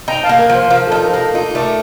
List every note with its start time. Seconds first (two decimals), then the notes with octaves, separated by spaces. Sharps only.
0.08 D#4 G5 A#5
0.23 F5 A5
0.29 A#3
0.39 A#4
0.49 F3
0.55 C5
0.71 F3 A#4
0.87 D#4 A4
1.03 A#4
1.14 A#3 A4
1.34 D#4 F4
1.55 A3 A#4 D5